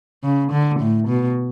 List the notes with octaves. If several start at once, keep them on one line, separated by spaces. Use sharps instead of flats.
C#3
D3
A2
B2